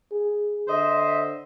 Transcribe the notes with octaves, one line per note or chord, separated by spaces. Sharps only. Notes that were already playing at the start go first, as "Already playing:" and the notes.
G#4
D3 C5 D#5 E5